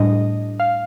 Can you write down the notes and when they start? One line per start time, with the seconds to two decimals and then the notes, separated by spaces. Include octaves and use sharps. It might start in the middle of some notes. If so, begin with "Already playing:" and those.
Already playing: A2 G3 D4 D#5
0.60 F5